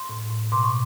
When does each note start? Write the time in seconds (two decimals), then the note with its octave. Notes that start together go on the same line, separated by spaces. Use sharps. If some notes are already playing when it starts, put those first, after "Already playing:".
Already playing: C6
0.09 A2
0.31 A2
0.52 B2 C6 D6
0.63 C#6